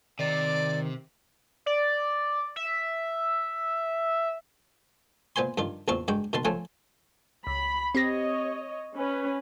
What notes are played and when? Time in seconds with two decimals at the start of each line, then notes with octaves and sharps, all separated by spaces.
0.19 C3 D#3 D5
1.66 D5
2.56 E5
5.36 A#2 B3 C5 G#5 C6
5.58 G2 D#3 F4
5.88 A1 E2 A#2 C4 F4 C#6
6.08 G2 G#3 F#4 G5
6.33 B2 D#3 B3 A5 C6
6.45 F3 A3 C4 C#4 G#5
7.47 C#2 B5
7.95 C4 G4 C#5 D#5 A#6
8.95 C#4 B4